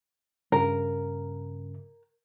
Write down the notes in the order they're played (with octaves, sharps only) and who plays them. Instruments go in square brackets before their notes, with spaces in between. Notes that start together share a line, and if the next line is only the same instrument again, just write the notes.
[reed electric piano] G2 C#3 [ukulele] A#4